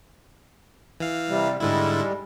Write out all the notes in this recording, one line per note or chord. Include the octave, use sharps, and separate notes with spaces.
E3 F5
C3 G3
G#2 D3 G3 G#3 E4